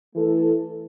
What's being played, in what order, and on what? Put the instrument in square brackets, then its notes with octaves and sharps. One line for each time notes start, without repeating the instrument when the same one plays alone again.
[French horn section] E3 A3 E4 A4